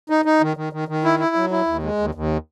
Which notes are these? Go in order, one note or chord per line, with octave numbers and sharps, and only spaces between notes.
D#4
D#4
D#3
D#3
D#3
D#3
E4
E4
F#3
E4
D#2
G#3
D#2
D#2